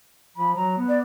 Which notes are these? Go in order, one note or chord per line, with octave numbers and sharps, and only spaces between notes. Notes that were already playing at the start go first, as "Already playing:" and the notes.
F3 B5
F#3 A#5
B3
D5